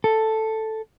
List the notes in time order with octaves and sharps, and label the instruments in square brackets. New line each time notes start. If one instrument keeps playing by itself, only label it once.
[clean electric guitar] A4